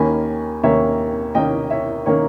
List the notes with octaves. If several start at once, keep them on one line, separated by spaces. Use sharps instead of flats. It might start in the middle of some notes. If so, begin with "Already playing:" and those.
Already playing: D#2 D#3 A#3 C#4 G#5 B5
D#2 D#3 A#3 C#4 C#5 E5
D#2 D#3 A#3 C#4 D#5 G5
C#5 E5
D#3 A#3 C#4 C#5